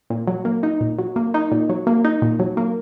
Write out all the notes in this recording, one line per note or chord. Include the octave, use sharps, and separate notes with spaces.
A#2
F#3
A#3
D#4
A#2
F#3
A#3
D#4
A#2
F#3
A#3
D#4
A#2
F#3
A#3